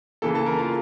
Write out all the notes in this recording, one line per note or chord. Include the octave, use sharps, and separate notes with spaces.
C#3 E3 A#3 A4 A5
A4 A5
A#4 A#5
F4 F5